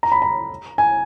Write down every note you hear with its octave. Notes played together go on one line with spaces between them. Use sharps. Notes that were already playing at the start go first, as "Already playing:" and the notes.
A#5
B5
A#5
G#5